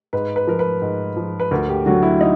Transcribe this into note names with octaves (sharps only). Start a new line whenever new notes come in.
G#2 B4
B4
F3 A#4
B4
G#2
F3
B4
D2 A#4
G4
D3 F#3 F#4
E4
D#4